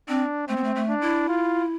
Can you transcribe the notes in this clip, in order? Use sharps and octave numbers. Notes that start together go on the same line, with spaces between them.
C4 D4
A3 C4
B3
A3
A3
D4
E4
F4